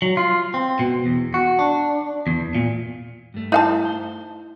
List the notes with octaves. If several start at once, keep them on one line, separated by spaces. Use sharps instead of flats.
F#3
F4
C4
B2
E2
F#4
D4
E2
A#2
G2 A3
D#4 E4 F5 A5
C5